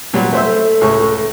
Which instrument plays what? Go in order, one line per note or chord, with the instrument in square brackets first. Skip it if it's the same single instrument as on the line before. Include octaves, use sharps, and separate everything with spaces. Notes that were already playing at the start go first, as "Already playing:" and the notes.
[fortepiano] A#2 F#3 G3
A3 C5 E5
[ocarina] A4
[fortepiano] C#2 A2 C#6